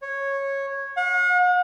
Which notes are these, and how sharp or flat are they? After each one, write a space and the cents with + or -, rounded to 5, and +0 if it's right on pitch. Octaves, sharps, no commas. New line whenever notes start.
C#5 -10
F#5 -45